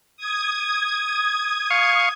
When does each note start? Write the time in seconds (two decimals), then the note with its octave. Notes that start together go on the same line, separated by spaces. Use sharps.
0.17 D#6 G#6
1.70 F5 C#6